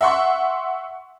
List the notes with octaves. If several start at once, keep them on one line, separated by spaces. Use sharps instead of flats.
E5 F#5 C6 C#6